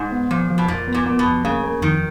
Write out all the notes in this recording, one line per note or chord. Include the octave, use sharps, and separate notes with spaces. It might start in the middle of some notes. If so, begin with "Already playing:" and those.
Already playing: G#2
B3
A#2 F3
F3
B2
F2 A#2
B3
A#2
B3
B2
F2
C#3 A#3
A#3
F2 D#3